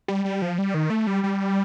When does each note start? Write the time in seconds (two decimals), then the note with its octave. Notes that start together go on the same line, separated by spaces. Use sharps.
0.08 G3
0.25 G3
0.42 F3
0.58 G3
0.74 D#3
0.90 A3
1.07 G3
1.23 G3